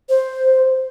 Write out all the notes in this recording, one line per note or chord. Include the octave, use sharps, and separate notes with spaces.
C5